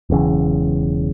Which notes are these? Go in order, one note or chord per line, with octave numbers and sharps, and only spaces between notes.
E1 B1 C#3 E3